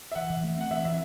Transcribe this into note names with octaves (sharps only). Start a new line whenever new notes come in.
E5
E3 F#5
E3
A3
C4 F#5
E3 E5
E3 E5